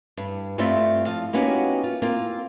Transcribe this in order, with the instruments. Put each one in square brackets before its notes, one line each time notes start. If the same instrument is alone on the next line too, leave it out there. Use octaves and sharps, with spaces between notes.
[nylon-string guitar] G2
G2 G3 A3 C4 F4 E5
F3 F5
A#3 B3 C#4 D#4 F#4 G4
F4
A#3 C4 F4 A#4